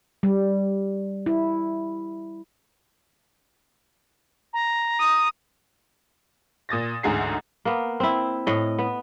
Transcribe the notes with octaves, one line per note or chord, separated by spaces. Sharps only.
G3
E4
A#5
D#6
A#2 D#6 A6 A#6
A1 D2 G#2 G#4 A#5 C7
A#3 B3
C4 E4
A2 D#5
B3